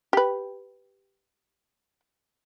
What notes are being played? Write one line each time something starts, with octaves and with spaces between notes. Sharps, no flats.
G4 B4